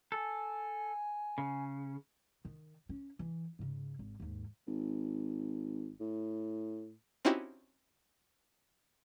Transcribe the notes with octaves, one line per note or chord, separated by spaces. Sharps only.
A4 G#5
C#3
D#3
C#4
E3
G#2 C#3
G#1
D#2 G#2
G#1
A2
C4 C#4 D#4 E4 F#4 G4